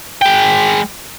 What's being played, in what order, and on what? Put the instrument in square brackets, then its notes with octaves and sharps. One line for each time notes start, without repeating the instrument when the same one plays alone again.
[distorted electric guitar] G#3 G5